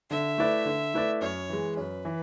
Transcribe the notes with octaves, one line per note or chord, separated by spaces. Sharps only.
D3 E5
A3 E4 B4 D5
D3
A3 E4 B4 D5
F#2 C#5
E3 G#3
F#2 B4
E3